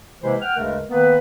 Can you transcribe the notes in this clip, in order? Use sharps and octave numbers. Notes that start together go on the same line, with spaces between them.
C3 E3 G#3 A#3 E4 C5
F#5 G5 F6
D2 G2 C#3 G#3 A3 A#4
D#3 A#3 B3 B4